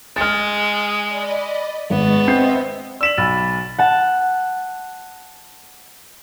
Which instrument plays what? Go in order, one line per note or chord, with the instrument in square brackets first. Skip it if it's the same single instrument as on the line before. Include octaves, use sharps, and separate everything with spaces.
[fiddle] G#3 [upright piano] F6 A6
[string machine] D5 D#5 B5
[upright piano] G#1 [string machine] G#3 C#6 A6 [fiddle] B3
[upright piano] C4 G6 C7 [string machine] C5 D#5 E5
[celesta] D5 B6 [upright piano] E6 E7 F#7
[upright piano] B1 [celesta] B5 A6
[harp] F#5 A5